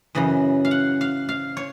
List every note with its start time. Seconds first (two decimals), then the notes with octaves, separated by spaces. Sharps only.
0.15 F#2 C#3 E3 D#5
0.65 F5
0.71 F#5
1.01 F5
1.29 F5
1.57 C#5